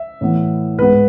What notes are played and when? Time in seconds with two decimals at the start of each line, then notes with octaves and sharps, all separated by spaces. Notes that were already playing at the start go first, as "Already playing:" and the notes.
Already playing: E5
0.21 A2 E3 B3
0.78 G#2 G#3 B3 B4